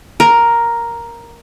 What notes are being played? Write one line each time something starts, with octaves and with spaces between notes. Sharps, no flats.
A#4